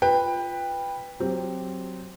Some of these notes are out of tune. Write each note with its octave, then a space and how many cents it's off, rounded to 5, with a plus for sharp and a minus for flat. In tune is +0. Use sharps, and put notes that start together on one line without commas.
F4 +0 B4 +0 G5 +20
F#3 +5 C4 +0 G4 +0